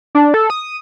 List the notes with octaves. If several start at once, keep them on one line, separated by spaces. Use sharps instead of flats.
D4
A4
D#6